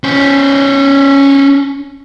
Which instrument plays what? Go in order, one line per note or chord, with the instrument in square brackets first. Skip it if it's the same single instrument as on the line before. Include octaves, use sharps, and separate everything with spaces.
[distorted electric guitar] C#4 C5